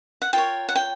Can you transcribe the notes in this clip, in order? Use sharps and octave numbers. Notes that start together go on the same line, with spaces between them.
F#5
F4 A#4 C#5 G5
F#5
G5